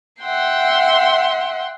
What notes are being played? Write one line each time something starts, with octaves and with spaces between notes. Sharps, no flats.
E5 F#5 G5 C6